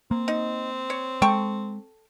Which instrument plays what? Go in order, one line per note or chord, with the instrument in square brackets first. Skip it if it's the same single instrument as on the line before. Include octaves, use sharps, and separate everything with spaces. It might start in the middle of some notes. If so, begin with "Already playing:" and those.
[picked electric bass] A#3 [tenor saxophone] C4
[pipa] D#4
C#5
[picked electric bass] G#3 [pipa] A4 G5 C#6